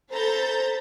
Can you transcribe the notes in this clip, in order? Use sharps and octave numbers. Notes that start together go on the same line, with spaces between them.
A4 C5 A#5 B5 G6 A6